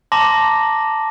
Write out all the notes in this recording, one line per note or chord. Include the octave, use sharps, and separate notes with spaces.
A5 A#5 C6 D6 A#6